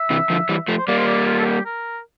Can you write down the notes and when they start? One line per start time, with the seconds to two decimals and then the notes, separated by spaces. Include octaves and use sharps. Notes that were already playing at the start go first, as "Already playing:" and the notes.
Already playing: E5
0.10 C3 E3
0.30 D3 F3
0.49 E3 G3
0.68 F3 A3
0.77 C5
0.87 G3 A#3 D5
0.99 C5
1.07 D5
1.26 F4
1.39 A4
1.45 G4
1.65 A#4